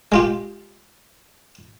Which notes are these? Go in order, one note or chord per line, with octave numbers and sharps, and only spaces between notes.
G#3 F4 G4